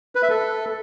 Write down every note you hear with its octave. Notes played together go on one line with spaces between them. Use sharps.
B4
E5
A4